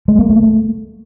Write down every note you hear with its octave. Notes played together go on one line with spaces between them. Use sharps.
G#3
A#3
A3